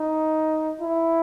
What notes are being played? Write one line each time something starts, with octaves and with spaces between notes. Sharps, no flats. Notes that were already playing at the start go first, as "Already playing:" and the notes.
Already playing: D#4
E4